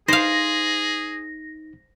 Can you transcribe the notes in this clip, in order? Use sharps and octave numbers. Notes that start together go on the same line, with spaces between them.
D#4 G#4 C5 F5 A#6